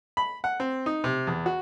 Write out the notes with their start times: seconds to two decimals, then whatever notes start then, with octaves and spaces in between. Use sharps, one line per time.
0.17 B5
0.44 F#5
0.60 C4
0.86 D#4
1.04 C3
1.27 E2
1.46 F#4